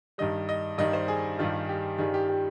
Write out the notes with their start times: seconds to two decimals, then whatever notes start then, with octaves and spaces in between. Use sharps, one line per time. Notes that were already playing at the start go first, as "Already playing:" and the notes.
0.18 G2 D#3 G3 D#5
0.49 D#5
0.78 G2 D#3 G3 D#5
0.93 C5
1.08 G#4
1.39 G2 D#3 G3 F4
1.69 G4
1.98 G2 D#3 G3 G#4
2.14 G4
2.29 G4